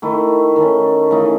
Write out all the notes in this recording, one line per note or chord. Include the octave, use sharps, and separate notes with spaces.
D#3 A3 E4
D#3 A3 C#4
C#3 E3 A3 D#4